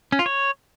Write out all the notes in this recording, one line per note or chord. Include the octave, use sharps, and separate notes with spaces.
C#4
F4
C#5